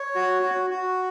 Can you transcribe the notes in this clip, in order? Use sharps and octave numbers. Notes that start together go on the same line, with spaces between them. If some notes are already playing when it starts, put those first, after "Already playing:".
Already playing: C#5
F#4
F#4
F#4